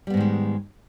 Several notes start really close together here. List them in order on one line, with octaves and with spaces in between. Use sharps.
G3 B3 G#2 D#3 G#3